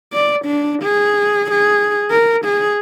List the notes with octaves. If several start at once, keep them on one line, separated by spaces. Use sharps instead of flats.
D5
D4
G#4
G#4
A#4
G#4